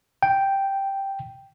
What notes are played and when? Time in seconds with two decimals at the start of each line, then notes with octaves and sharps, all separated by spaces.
0.23 G5